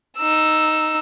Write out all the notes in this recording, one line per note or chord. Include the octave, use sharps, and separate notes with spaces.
D#4 E6